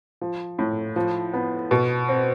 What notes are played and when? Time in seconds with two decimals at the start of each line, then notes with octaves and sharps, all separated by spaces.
0.21 F3
0.59 A2
0.96 F3
1.34 B3
1.71 B2
2.09 C4